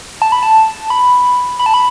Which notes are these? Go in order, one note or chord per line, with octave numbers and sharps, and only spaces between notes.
A5
B5
A5
B5
B5
A5
B5